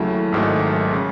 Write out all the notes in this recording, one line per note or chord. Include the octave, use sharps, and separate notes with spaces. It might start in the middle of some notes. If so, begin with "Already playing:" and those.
Already playing: D#2 C#3 F#3 A3 E4
G#1 G#2 D#3 F#3 A3
C#3